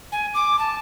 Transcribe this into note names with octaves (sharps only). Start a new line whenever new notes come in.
G#5
D6
A5